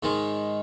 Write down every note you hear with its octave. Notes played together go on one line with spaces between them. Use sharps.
G#2 D#3 G#3